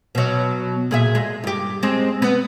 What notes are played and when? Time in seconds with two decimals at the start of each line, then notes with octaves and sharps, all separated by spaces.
0.15 B2 F#3
0.91 A#2 G#4 E5
1.15 G#3
1.44 G2 G4
1.83 G#3 C4
2.22 B3